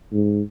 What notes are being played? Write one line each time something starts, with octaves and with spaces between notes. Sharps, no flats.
G#2